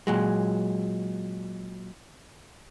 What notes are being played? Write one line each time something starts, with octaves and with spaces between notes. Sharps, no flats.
A#2 F#3 G#3